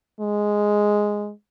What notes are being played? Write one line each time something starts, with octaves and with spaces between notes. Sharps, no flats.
G#3